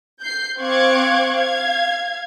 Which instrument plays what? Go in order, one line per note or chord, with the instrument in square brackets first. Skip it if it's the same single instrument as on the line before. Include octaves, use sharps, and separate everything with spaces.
[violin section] G6 C7
C4 F5 C#6 D6 F#6 G#6
F5 G#6